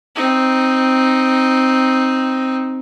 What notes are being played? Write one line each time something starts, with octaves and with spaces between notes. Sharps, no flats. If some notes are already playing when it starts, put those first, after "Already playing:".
C4 D#4